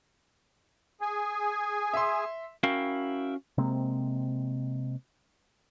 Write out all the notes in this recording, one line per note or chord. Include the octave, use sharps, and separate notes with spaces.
G#4 G#5
E5 C6
C#4 E4 F#4 A#4 F5 G5
C3 G#3 A#3 C4